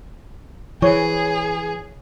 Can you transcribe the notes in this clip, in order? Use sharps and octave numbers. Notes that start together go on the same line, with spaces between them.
E3 G#4 C5 C#5 C#6